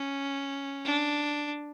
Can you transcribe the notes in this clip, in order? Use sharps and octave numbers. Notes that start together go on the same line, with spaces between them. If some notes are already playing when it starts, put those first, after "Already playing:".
Already playing: C#4
D4